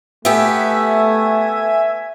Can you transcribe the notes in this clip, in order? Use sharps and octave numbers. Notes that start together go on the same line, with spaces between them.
A3 B3 G4 E5 G#5